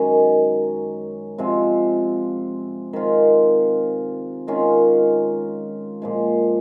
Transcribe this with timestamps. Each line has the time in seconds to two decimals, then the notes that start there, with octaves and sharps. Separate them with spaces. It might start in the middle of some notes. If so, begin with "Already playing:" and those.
Already playing: F#2 D#3 G#3 C#4
1.38 C3 F3 G#3 C4
2.93 D#3 G#3 C4 F4
4.47 D#3 G#3 C#4 F4
6.02 A#2 F3 G#3